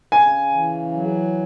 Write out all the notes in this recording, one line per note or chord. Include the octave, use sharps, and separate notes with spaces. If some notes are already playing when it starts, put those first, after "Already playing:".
C#3 G#5
E3
F#3